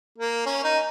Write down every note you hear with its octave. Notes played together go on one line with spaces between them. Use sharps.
A#3
C#4
D#4